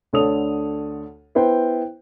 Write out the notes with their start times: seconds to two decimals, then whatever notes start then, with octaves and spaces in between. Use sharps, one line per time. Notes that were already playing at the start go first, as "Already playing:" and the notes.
0.13 D2 D3 A4 C#5 D#6 F7
1.35 B3 E4 B4 C5 G5